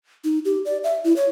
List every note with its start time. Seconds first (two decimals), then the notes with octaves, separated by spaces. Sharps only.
0.24 D#4
0.45 G4
0.65 D5
0.84 E5
1.04 E4
1.16 C#5